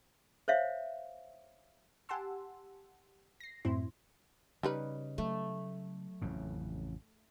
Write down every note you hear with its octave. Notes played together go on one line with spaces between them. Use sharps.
C5 C#5 E5 F5
G4 F#5 G#5 A5 C6 E6
A#6 C7
F#2 A2 F#3 C4 E4 C6
C#3 G3 D#4 B4
F#3 A3
A1 F2 C#3